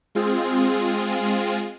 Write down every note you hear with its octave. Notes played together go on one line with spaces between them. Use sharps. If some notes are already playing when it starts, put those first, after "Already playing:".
G#3 C4 F4 G#4